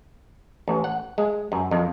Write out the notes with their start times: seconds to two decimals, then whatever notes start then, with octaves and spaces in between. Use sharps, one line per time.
0.68 A1
0.84 F#5
1.18 G#3
1.52 F#2
1.71 F2